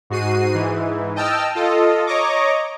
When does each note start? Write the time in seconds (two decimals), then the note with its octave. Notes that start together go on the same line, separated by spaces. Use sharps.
0.10 G#2 F#4 C7 D#7
0.54 G#2 E3
1.16 D#5 G5 A5 E6 F6
1.55 F4 A4 D#5
2.07 C#5 D#5 A#5 C#6 D6